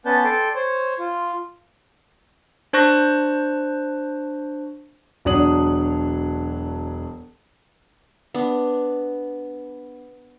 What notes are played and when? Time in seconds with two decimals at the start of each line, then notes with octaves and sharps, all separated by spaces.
0.06 B3 C#4 B4 D5 A5 G6
0.24 A4 D5 G5 C6
0.55 C5 C#5
0.99 F4
2.73 D4 C5 A5 C#6 F#6 A#6
5.25 E1 F#3 D4 C#5 D#6 F#7
8.34 B3 D4